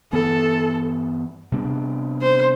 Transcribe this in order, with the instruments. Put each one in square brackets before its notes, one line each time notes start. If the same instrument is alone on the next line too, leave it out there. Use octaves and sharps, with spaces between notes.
[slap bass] G2 E3 B3 [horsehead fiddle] A4
[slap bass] C3 G3 B3 D4
[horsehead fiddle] C5